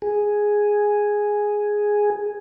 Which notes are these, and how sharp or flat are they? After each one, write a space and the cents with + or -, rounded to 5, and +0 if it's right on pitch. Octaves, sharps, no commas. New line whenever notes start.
G#4 +0